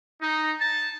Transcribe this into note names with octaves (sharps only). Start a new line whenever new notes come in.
D#4
A5